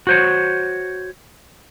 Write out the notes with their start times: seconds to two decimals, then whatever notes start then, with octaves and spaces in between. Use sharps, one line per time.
0.07 F#4 C5 C#5